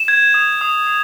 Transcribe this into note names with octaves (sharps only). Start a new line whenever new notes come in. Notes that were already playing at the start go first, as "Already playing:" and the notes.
Already playing: E7
G#6
D#6
D#6
D#6